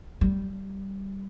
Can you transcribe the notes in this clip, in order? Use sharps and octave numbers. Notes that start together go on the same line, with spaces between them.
G3